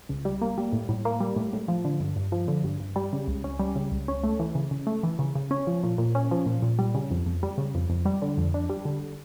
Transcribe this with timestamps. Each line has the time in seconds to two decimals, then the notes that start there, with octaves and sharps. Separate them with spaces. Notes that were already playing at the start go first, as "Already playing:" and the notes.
0.09 C#2
0.25 G3
0.42 A#3
0.58 G3
0.72 A2
0.89 A2
1.05 A#3
1.20 G3
1.36 A2
1.53 A2
1.68 F3
1.85 D3
2.00 G2
2.16 G2
2.32 F3
2.48 D3
2.64 G2
2.80 G2
2.96 G3
3.13 C#3
3.28 C#2
3.44 C#4
3.60 G3
3.76 C#3
3.92 C#2
4.08 C#4
4.24 A3
4.40 E3
4.55 C#3
4.71 C#3
4.87 A3
5.03 E3
5.19 C#3
5.35 C#3
5.51 C#4
5.67 F3
5.83 A#2
5.98 A#2
6.15 C#4
6.31 F3
6.46 A#2
6.62 A#2
6.79 G3
6.95 C#3
7.11 F2
7.26 F2
7.43 G3
7.58 C#3
7.75 F2
7.90 F2
8.05 G3
8.22 D3
8.38 F2
8.54 D4
8.69 G3
8.85 D3